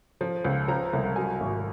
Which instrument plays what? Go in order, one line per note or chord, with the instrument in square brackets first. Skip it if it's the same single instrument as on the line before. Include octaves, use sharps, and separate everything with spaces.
[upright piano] F3
C#2
F3 A#5
C2
F#3 G#5
G#1